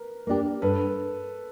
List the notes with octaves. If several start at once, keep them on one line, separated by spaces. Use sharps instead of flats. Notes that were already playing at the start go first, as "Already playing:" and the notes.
Already playing: A#4 B4
A#3 D4 G4
G2 A4 B4